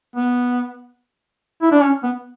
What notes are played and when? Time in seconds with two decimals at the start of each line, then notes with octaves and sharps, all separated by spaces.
0.16 B3
1.62 E4
1.72 D4
1.81 C#4
2.03 B3